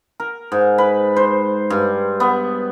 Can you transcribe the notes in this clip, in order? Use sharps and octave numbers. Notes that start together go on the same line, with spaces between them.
A#4
G#2
B4
C5
G2
B3